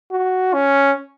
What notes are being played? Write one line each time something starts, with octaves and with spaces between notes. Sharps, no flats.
F#4
C#4